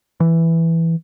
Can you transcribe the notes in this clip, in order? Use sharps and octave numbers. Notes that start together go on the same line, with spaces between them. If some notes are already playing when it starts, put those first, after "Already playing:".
E3